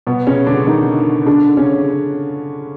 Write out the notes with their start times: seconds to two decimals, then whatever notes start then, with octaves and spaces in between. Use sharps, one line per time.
0.07 B2 B3
0.27 C#3 C#4
0.46 D3 D4
0.67 D#3 D#4
1.26 D3 D4
1.57 C#3 C#4